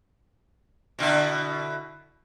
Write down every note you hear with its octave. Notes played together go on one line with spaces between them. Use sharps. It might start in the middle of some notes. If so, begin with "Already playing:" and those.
B2 D3 E4